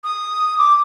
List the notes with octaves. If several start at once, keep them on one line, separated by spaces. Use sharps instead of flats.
D#6
D6